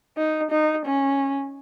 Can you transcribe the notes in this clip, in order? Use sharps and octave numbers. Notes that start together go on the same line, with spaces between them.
D#4
D#4
C#4